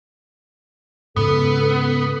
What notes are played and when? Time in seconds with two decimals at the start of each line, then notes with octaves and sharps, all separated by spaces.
1.16 G#2 C#3 B3 A4